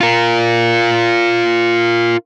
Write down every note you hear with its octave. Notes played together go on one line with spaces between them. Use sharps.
F4 A#4